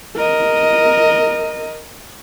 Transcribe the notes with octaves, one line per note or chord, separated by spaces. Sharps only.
A#4 D#5